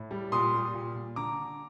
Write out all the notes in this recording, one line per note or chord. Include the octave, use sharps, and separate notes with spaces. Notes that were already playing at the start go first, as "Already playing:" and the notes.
Already playing: A2
G3
A#2 C6 D#6
G3
A#2
A#2
D3 A#5 D6